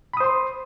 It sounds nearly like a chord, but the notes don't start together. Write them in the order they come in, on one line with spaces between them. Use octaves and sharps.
B5 D#6 C5 C6